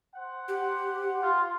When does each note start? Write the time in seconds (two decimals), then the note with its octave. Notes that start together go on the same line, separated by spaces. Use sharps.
0.15 C5 F#5
0.48 G4
1.21 F4